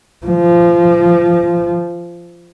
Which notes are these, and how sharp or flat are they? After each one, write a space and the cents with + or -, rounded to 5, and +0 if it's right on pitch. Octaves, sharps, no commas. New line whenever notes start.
F3 -20